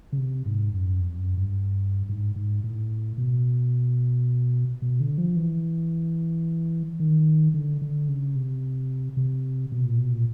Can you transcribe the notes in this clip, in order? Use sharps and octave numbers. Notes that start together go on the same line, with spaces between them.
C#3
C3
G#2
F#2
F2
F#2
G2
G#2
G#2
A2
B2
B2
D3
F3
E3
D#3
D3
D3
C#3
C3
C3
B2
A#2
B2
A#2